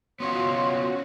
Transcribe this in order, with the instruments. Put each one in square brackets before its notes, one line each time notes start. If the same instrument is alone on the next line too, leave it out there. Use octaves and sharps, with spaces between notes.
[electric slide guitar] B3 C#4 F4 [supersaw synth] F#4 [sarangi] C#5 [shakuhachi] C6